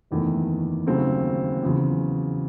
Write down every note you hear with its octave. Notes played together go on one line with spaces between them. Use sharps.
F#1 E2 D#3 A3
D#2 C#3 F#3 A3 C4
E2 C#3 F#3